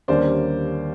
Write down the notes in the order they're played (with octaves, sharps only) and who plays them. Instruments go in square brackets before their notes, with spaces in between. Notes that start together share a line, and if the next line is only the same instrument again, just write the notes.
[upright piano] D#2 D3 G3 A#3 C#4 C5 D5